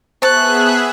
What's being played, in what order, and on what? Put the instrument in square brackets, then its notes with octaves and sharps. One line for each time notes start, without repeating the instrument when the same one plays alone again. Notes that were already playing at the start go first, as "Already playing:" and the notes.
[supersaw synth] B3 G#4 E5 [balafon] C5 [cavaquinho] A5 C#6 [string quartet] F#6